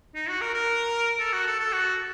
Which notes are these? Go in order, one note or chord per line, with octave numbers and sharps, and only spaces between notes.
D#4
F#4
A#4
A#4
A4
F#4
A4
A4
F#4